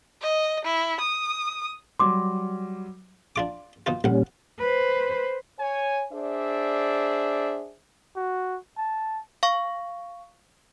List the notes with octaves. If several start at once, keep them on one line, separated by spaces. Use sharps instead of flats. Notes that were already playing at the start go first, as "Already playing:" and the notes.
D#5
E4
D#6
F#3 G3 C6 D6
D4 F4 D6
B2 D#4 F4
A1 A#2 G3 C#4 F#5
B4 C5
C#5 G#5
D4 G#4 C5 D5 E5
F#4
A5
F5 C#6